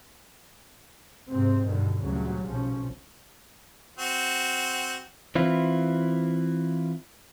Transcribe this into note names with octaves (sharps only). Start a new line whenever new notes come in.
G#2 C3 C4
G2 B2 D3 D#3
D2 A#2 C#3 F#3 G3 C#4
B1 F3 C#4
C4 F#4
E3 C4 E4 F4